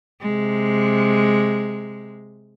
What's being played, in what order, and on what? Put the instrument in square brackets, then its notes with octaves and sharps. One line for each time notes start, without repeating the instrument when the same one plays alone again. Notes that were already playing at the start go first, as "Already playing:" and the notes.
[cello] C3 G#3